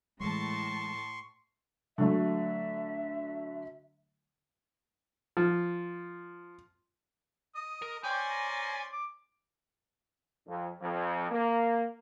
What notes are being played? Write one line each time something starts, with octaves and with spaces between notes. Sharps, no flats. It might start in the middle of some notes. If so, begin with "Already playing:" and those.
A2 E3 G#3 A5 C6 C#6
D3 F#3 A3 E5
F3
D#5 D#6
A#4
C#4 C5 D5 G5 G#5
A#5
D6
F2
F2
A#3